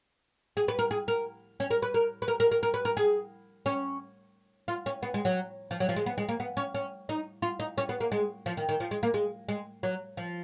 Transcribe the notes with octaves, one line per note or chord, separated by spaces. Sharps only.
G#4
B4
A#4
G#4
A#4
C#4
A#4
B4
A#4
B4
A#4
A#4
A#4
A#4
B4
A#4
G#4
C#4
F4
C#4
B3
G#3
F#3
F3
F#3
F3
G#3
B3
G#3
A#3
B3
C#4
C#4
D#4
F4
D#4
C#4
B3
A#3
G#3
F3
D#3
D#3
F3
G#3
A#3
G#3
G#3
F#3
F3